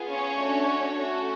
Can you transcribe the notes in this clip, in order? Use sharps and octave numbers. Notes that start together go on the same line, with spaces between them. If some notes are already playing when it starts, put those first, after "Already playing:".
Already playing: B3 F4 G#4
C#4 C#5
A3 D4 F#4 A4
A3 C#4 F#4 A4